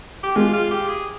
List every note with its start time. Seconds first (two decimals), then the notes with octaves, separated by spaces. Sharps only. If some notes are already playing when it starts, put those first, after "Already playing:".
0.24 G4
0.36 G#3 F4
0.53 F4
0.71 G4
0.88 G#4